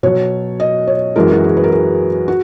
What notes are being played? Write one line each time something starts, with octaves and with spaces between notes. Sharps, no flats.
B2 F#3 C#5
D#5
C#5
F#2 E3 G#3 A#4
F#4
G#4
B4
A#4
G#4
F#4